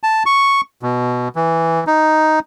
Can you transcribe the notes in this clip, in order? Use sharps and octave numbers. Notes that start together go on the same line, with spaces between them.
A5
C#6
B2
E3
D#4